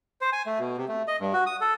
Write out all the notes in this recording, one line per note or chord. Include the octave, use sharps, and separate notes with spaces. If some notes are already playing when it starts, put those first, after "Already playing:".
C5
G#5
A3
B2
C3
A3
D#5
G2
F#4
D#6
A4